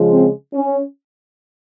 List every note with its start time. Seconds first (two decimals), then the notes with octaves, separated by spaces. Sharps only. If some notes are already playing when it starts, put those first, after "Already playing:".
Already playing: C#3 F3 G#3
0.12 C4
0.54 C#4